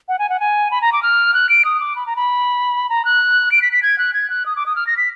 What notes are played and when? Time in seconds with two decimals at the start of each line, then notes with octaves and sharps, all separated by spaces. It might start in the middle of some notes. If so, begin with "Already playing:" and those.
0.09 F#5
0.19 G#5
0.30 F#5
0.40 G#5
0.71 B5
0.82 A#5
0.93 D6
1.03 F6
1.34 F#6
1.49 D7
1.65 D#6
1.80 D6
1.96 B5
2.06 A#5
2.16 B5
2.90 A#5
3.05 F#6
3.52 D7
3.62 B6
3.73 B6
3.83 G#6
3.98 F#6
4.13 G#6
4.30 F#6
4.46 D#6
4.56 D6
4.66 D#6
4.76 F6
4.87 A#6
4.97 B6